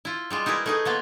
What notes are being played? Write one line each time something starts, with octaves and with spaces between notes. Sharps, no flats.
E4 F4
G3 G#3 F4
D#4 E4 G#4 A#4 B4
A3 D#4 G#4
A#3 B3 F4